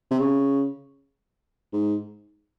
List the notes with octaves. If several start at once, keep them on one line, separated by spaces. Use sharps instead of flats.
C3
C#3
G#2